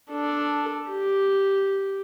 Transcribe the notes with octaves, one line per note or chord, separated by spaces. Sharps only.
D4 A4
G4